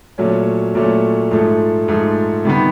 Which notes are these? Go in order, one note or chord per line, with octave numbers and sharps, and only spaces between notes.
A#2 F#3 A3 C#4
A#2 F#3 A3 C#4
G#2 F3 A3
G#2 F3 A3
C3 D#3 G3 B3